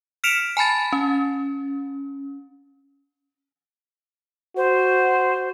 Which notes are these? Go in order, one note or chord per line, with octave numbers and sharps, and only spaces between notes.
F6 B6 C#7 D7 E7 F7
G#5 A5 B5 A6
C#4
F#4 C5